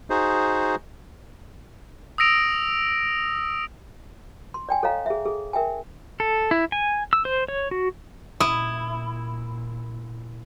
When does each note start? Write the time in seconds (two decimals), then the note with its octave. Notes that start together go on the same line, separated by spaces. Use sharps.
0.10 D#4 F#4 G#4 C5
2.18 D#6 E6 A#6 D7 F7
4.54 C6
4.69 D5 G5 G#5
4.83 A4 C#5 D#5 F5 A#5
5.06 G#4 E5
5.26 G#4 A4
5.53 A#4 E5 G5 G#5
6.20 A4
6.51 E4
6.72 G#5
7.13 E6
7.25 C5
7.48 C#5
7.71 F#4
8.40 A#2 E4 D#6